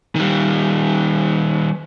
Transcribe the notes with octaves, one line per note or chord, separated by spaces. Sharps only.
D#3 G3